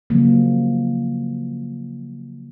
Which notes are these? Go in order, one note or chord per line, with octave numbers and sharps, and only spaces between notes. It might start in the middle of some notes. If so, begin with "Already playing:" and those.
C#3 F3 F#3 G#3 A#3